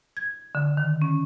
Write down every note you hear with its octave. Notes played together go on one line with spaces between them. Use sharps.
G#6
D3
D#3
C#4